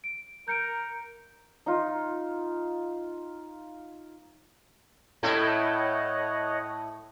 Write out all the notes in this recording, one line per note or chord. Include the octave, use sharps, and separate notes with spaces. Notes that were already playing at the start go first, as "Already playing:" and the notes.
D7
A#4 G6 C#7 D7
D#4 F4
A2 A3 E4 C#5 D#5 F#5